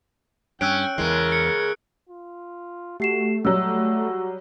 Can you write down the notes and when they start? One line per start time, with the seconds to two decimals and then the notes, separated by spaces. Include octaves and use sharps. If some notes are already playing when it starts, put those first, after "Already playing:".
0.61 G2 C#4 G5 E6 F#6 D7
0.98 E2 C#3 E3 G#3 A#4
1.32 C#7
2.09 F4
3.00 A3 F#4 G4 C7 E7
3.45 F#3 G3 F#4 E6